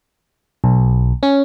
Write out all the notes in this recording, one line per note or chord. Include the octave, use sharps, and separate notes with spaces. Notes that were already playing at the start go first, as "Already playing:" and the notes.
B1
C#4